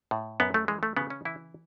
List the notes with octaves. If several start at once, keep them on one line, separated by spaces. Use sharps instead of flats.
A2
F#2 B3
A3
E3 G#3
A3
C#3 B3
C#4
E3 E4